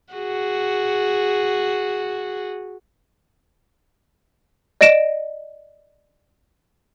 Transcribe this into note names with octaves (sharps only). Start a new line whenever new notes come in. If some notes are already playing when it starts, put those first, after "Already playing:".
F#4 G#4
D5 D#5 A#6 D7 E7